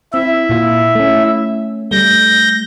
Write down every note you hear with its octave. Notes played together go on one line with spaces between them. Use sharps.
C4 E4 E5
A#2 F4
A3 C#4
G3 A3 G6 A#6